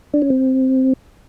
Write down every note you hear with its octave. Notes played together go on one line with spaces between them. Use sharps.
D4
C#4
C4